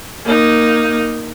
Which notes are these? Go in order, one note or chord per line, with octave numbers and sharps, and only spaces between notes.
A#3 D#4